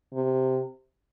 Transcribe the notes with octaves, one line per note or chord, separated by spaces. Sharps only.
C3